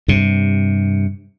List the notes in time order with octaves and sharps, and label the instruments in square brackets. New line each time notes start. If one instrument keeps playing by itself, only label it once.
[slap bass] G2 C3